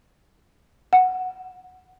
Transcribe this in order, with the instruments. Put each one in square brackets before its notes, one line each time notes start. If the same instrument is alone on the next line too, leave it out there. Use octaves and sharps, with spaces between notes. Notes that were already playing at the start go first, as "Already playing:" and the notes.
[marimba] F#5